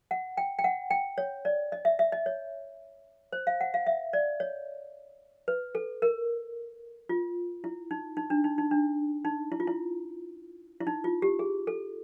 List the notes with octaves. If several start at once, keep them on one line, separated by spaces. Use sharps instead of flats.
F#5
G5
G5
F#5
G5
C#5
D5
D#5
E5
E5
D#5
C#5
C5
F5
F#5
F5
E5
D5
C#5
B4
A4
A#4
F4
E4
D#4
D#4
D4
D#4
D#4
D4
D#4
E4
F4
E4
E4
D#4
F4
G4
G#4
A4